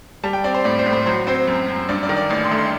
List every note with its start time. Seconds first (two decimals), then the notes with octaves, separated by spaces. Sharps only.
0.23 G3 A5
0.33 G5
0.44 C4 D5
0.54 C5
0.64 A2 D5
0.79 C5
0.86 A2
0.93 C5
1.06 F#3 C5
1.27 C4 C5
1.47 F#2
1.68 F#2
1.89 G2 D5
2.03 D5
2.09 D#3
2.16 D5
2.30 A1
2.44 C6
2.51 A3
2.58 C6